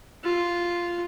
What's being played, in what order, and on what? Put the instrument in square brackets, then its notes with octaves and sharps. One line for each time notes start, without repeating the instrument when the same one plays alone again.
[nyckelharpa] F4